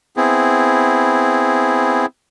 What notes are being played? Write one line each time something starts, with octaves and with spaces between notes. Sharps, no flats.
B3 C4 E4 G#4